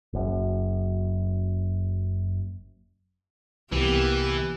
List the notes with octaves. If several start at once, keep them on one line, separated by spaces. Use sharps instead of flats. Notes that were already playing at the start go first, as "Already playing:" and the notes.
F#1 F#2
C2 E3 A#3 B3 G4